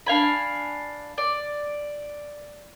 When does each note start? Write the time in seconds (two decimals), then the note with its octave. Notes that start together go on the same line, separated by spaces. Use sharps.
0.06 D4 F5 G#5 B5
1.18 D5